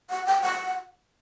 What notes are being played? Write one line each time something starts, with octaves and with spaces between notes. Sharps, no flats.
F#5
G5
F#5